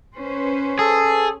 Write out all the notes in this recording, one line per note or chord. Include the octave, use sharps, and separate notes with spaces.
C#4 B4 C5
G#4 A4